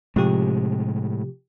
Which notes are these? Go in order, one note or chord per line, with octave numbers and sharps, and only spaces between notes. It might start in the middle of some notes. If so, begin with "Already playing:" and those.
A2 C3 F3 G#3 G4